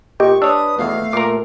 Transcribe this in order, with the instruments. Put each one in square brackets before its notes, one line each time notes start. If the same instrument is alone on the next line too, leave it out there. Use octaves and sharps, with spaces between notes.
[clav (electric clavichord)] A#2 [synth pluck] G4 D#5 G5 [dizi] C#6
[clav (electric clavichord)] D4 C#5 [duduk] B4 [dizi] D#6 [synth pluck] E6
[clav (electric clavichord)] E2 B2 [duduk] A3 [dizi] F5
[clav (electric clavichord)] A#2 A#4 [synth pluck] D6 C7